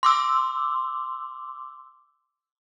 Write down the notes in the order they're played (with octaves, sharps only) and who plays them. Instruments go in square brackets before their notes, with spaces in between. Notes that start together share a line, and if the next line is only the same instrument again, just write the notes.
[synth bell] C6 D6 E6